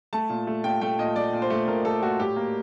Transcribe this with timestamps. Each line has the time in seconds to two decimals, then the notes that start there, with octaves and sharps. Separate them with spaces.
0.13 A3 A5
0.30 A#2
0.47 A3
0.64 A#2 G5
0.81 A3 G5
0.99 A#2 D#5
1.16 A3 D5
1.33 A#2
1.42 C5
1.50 A3
1.67 A#2 A#4
1.85 A3 A4
2.02 A#2 F#4
2.19 A2 G4
2.36 A#3